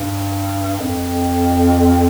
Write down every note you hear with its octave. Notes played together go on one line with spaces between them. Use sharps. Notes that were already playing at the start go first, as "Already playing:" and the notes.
Already playing: G2
F2